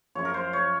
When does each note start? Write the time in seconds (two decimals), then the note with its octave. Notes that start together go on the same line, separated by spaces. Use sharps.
0.15 F#2 F3 C#5
0.25 A#4
0.34 C5
0.53 C#5